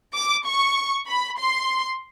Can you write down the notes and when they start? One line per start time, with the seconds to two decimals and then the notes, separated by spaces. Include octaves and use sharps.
0.14 D6
0.46 C#6
1.08 B5
1.39 C6